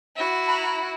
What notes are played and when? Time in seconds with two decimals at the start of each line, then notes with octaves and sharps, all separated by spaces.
0.16 E4 F#4
0.48 A#5 B5